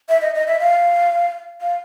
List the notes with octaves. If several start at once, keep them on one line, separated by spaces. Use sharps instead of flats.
E5
D#5
D#5
E5
F5
F5